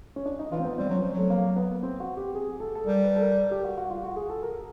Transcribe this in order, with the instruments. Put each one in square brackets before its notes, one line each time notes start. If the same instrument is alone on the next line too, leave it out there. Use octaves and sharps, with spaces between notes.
[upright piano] C#4
D4
D#4
[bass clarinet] E3 [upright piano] F4
[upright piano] C4
B3
[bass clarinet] G3 [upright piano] C4
[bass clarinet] F#3 [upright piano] C#4
[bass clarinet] F3
[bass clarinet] F#3 [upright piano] A3
[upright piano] A#3
B3
C4
F#4
G4
G#4
A4
A4
[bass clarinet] G3 [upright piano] A#4
[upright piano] B4
A4
A#4
G4
F#4
F#4
F4
F#4
G#4
A4
A#4